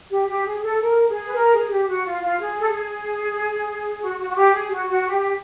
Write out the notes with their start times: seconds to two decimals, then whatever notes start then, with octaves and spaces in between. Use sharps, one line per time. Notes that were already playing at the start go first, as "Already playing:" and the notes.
0.09 G4
0.27 G4
0.45 G#4
0.63 A4
0.81 A#4
1.07 G#4
1.27 B4
1.34 A#4
1.51 G#4
1.69 G4
1.88 F#4
2.05 F4
2.22 F4
2.40 G#4
2.58 A4
2.67 G#4
4.00 F#4
4.18 F#4
4.29 F#4
4.36 G4
4.53 G#4
4.67 G4
4.71 F#4
4.89 F#4
5.07 G4